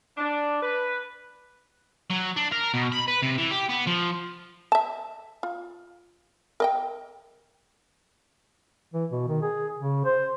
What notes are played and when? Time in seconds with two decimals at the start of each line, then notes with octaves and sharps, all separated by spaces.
0.17 D4
0.62 B4
2.11 F#3
2.37 D4
2.52 A#4
2.74 B2
2.92 B5
3.08 B4
3.23 C3
3.38 E3
3.51 G4
3.69 B3
3.87 F3
4.72 E5 A5
5.43 F4
6.60 A#4 D#5 G5
8.94 E3
9.12 B2
9.28 D#3
9.42 G#4
9.79 C#3
10.05 C5